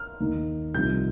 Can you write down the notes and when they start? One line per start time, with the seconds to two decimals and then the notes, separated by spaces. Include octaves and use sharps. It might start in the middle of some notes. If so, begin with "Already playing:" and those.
Already playing: F6
0.20 D#2 D#3 A#3 D#4
0.74 C2 C3 F3 D#4 G6